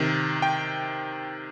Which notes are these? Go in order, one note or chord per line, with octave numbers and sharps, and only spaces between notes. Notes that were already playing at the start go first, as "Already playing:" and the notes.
Already playing: C3 D#3
G5